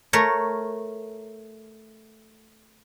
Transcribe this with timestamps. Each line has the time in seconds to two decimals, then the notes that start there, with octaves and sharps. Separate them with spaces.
0.13 A3 A#4 C#5